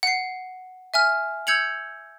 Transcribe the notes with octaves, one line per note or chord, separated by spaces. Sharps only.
F#5 C7
E5 G#5 F6
E6 G6 G#6 C#7 F7 F#7